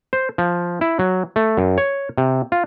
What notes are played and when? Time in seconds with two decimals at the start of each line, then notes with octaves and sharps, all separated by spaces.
0.13 C5
0.38 F3
0.81 E4
0.99 F#3
1.36 A3
1.57 F#2
1.78 C#5
2.18 C3
2.52 F4